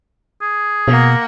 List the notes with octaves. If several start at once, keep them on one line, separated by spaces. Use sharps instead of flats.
G#4
B2 A#3 F#5